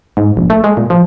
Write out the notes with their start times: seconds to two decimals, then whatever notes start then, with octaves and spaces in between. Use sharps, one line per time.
0.17 G#2
0.37 A#1
0.50 A3
0.64 G#3
0.77 A#2
0.90 F3